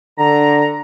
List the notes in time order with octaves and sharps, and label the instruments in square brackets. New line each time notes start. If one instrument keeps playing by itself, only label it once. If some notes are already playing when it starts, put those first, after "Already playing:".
[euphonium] D3 [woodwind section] A#5